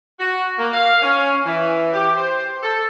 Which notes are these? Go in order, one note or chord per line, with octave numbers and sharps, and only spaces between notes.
F#4
A#3
F5
C#4
E3
G4
C5
A4